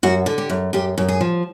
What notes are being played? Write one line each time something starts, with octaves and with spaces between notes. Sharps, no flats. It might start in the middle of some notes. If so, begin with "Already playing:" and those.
F#2 F#4
D3
G4
F#2
F#2 G4
F#2
G#4
F3